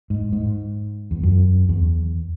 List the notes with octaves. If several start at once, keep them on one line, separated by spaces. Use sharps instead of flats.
G#2
G#2
E2
F#2
E2